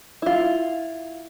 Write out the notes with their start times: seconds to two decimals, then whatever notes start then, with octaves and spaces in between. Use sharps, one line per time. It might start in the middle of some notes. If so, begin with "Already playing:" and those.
0.22 E4 F4